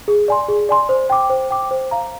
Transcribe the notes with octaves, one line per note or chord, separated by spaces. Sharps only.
G#4
D5 G#5 C6
G#4
D5 G#5 C6
C5
G5 D6
C5
G5 D6
C5
F5 A#5